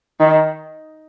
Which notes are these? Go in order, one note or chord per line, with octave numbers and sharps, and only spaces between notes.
D#3